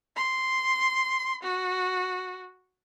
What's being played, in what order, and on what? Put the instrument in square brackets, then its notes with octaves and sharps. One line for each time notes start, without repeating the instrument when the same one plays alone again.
[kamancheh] C6
F#4